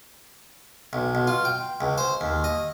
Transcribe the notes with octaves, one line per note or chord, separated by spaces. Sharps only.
B1
B1
F4
G5
C#2
C5
D#2
D#5